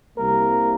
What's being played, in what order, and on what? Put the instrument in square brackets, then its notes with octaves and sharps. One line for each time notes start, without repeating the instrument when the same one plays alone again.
[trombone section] C2 C3 G3 A#3 A#4